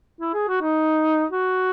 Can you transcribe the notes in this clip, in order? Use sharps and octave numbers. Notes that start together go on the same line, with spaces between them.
E4
G#4
F#4
D#4
F#4